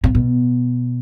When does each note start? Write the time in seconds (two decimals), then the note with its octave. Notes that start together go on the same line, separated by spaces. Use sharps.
0.04 C3
0.15 B2